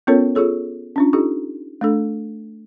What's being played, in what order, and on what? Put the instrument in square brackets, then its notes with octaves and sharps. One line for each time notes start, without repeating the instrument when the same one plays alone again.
[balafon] B3 C#4 F4 A4 A#4 C#5
F4 G#4 A4 C#5
C#4 D4 F4
D#4 F4 G4 A4
A3 D4 A4